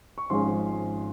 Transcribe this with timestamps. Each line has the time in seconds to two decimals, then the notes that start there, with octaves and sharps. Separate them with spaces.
0.18 C#6
0.30 G#1 G#2 F3 G#3 C#4 C6